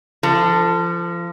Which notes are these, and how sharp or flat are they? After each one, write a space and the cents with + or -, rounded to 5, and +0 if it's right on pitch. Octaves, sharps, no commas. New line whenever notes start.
F3 -30 A4 +10